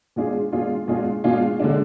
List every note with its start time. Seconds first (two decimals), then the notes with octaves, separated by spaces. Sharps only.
0.16 B2 G#3 D4 F4 G#4
0.52 B2 G#3 D4 F4 G#4
0.88 B2 G#3 D4 F4 G#4
1.24 B2 G#3 D4 F4 G#4
1.60 D3 G#3 D4